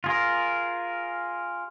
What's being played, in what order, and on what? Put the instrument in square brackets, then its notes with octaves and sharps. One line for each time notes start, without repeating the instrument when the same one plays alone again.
[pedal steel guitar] F4 G#4 A#4